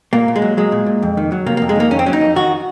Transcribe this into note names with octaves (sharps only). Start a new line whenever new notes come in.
A#2 A#3
A#2
G#3
F#3
F#3 G#3
A#2
A#2
F2
D#3
F#3
C3 A#3
A#3
F2
G#3
D#3 A#3
F2 C#4
C4
F#3 C#4
D#4
F2
D#3 F#4